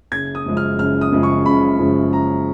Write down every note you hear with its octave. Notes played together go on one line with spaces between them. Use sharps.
F#1 G#6
D#6
F#2 C#3 F3 G#3
F6
F#1 F6
D#6
F#2 C#3 F3 G#3
C#6
F#1 B5
F#2 C#3 F3 G#3
F#1 A#5